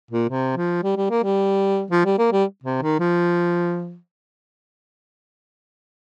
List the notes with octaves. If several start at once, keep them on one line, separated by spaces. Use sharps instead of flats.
A#2
C3
F3
G3
G3
A#3
G3
F3
G3
A#3
G3
C3
D#3
F3